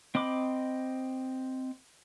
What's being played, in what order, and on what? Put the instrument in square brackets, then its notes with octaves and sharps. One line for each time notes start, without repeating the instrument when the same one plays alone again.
[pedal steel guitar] C4 D#5 B5 D6